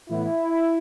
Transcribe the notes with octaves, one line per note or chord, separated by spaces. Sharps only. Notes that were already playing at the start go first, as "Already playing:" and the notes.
A2 E3 B3 E4